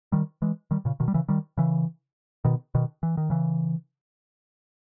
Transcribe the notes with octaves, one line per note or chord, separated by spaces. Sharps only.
D#3 G3
E3 G#3
D#3 G3
A#2 C#3
B2 D#3
G3
C#3 E3
D#3 G3
C#3 E3
B2 D#3
B2 D#3
E3
D#3
C#3 E3